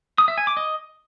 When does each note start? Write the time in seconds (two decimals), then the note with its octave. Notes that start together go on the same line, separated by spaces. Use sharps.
0.18 D#6
0.28 E5
0.38 G#5
0.47 D6
0.57 D#5